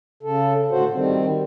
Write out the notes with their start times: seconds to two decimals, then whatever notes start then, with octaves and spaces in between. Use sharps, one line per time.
0.23 C#3 A4
0.71 A2 D3 F#4 C5
0.93 D#3 G3 C4